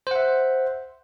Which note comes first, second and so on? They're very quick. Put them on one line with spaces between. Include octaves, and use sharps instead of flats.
C5 F#5 E5